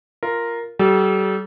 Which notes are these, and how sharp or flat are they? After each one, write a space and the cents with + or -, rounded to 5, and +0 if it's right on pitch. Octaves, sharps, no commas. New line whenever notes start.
F4 -5 A#4 +0
G3 -40 A4 -45